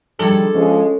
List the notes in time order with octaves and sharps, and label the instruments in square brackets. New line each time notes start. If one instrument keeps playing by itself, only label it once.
[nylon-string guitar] D#3 F3 G3 [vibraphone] D4 G#4 [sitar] A4
[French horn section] F3 G#3 [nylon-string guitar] C#4